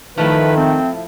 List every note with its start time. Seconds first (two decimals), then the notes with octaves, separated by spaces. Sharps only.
0.18 D#3 F3 A3 E4 B4
0.57 C4